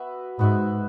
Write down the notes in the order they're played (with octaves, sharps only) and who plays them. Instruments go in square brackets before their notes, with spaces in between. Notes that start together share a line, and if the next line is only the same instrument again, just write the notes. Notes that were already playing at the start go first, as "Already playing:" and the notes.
Already playing: [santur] B3 F#4 B4 E5
[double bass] G#2 [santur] B3 F#4 B4 E5